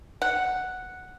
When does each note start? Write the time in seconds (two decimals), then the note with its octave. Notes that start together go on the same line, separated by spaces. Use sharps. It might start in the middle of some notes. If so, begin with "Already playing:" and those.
0.22 F#5